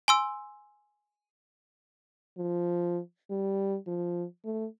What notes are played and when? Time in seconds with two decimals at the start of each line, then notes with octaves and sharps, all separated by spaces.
0.08 G#5 C6 E6
2.38 F3
3.30 G3
3.87 F3
4.45 A3